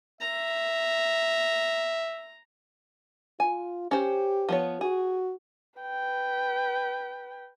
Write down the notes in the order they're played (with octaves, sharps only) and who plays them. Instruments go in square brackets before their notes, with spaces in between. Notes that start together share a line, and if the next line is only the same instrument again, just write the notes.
[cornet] E5 [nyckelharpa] A#5
[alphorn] F4 [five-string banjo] G#5
[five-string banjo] C#4 C5 [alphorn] G4
[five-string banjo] F3 B3 C#5
[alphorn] F#4 [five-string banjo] G#4
[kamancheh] B4 G5